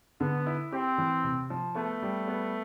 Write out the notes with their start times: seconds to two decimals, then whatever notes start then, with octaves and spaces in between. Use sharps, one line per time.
0.20 D3 B3
0.47 E4
0.73 C4 G4
0.98 E3
1.24 C3
1.50 F3
1.75 A3 B3
2.02 G3
2.28 B3